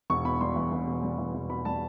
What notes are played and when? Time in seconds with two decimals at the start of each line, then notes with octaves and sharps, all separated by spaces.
0.10 E1 C#6
0.25 B2 B5
0.41 G3 C6
0.56 E2
0.72 E1
0.87 B2
1.03 G3
1.18 E2
1.34 E1
1.50 B2 B5
1.65 G3 A5